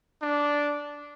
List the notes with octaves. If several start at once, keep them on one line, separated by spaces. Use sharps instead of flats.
D4